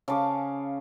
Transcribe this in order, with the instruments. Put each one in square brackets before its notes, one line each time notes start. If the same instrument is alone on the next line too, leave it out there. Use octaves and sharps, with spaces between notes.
[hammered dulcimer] C#3 F5 A5 D6